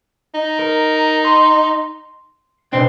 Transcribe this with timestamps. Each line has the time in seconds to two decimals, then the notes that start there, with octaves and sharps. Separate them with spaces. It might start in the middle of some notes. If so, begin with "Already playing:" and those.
0.34 D#4
0.59 A#4
1.25 C6
2.73 B2 C4 D4